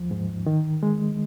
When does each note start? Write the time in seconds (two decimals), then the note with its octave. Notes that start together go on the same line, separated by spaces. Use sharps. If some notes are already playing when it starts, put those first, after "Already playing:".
Already playing: D#2 F3
0.11 G#2
0.46 D#3
0.83 G#3